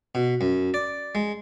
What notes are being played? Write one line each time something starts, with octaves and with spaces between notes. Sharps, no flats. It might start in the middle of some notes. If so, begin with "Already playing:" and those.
B2
F#2
D5
G#3